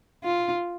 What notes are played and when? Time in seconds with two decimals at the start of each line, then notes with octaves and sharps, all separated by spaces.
0.24 F4